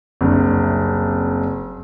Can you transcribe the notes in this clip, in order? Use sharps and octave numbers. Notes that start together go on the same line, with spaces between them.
F#1 C2 D4